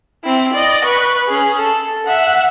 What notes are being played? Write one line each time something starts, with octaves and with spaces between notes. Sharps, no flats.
C4 E4
D5 D#5
B4 C#6
C#4 G#4
A4
E5 F#5